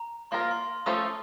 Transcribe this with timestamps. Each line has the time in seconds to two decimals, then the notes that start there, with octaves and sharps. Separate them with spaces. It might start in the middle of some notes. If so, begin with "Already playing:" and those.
Already playing: A#5
0.31 F3 A#3 F4 A#4 C6
0.41 A#5
0.51 C6
0.86 F3 A3 C#4 A4 C5 D#6